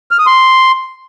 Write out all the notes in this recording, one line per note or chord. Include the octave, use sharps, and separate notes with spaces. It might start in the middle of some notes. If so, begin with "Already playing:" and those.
F6
D#6
C6